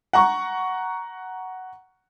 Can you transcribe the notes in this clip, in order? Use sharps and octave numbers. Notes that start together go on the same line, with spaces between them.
F#5 A#5 C#6